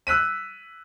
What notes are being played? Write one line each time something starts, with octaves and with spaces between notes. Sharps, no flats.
E6 F#6 B6 D#7